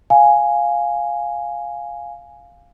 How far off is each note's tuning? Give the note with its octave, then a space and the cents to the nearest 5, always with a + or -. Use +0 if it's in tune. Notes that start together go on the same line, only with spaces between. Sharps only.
F5 +0 G#5 +0